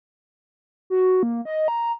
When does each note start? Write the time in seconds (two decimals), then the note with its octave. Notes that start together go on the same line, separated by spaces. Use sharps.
0.90 F#4
1.23 A#3
1.45 D#5
1.68 A#5